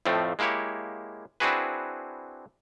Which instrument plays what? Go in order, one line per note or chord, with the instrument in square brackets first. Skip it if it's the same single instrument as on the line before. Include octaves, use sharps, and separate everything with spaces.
[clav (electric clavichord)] F2 A2 F3 A3 C4
G#3 A#3 E4 G4 C#5
C4 D4 E4 F#4 G#4 B4